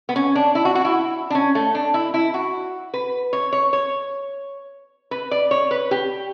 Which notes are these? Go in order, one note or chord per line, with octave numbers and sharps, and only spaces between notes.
B3
C#4
D4
E4
F#4
F#4
E4
D4
C#4
A3
D4
E4
E4
F#4
B4
C#5
C#5
C#5
B4
D5
C#5
B4
G4